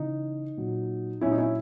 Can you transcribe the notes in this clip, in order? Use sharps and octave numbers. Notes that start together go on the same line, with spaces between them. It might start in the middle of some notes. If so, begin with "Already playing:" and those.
Already playing: C#3 E3 D#4
A#2 F#3
A#2 F#3 C#4 E4
D#4
C#4 E4